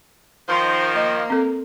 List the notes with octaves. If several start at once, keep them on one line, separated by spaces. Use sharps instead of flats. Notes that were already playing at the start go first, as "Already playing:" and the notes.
D#3 F3 C5
A#3 D#5
C4 A4